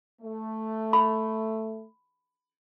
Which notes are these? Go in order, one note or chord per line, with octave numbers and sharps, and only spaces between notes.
A3
B5